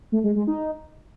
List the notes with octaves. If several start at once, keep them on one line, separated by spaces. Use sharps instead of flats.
A3
G#3
G#3
D#4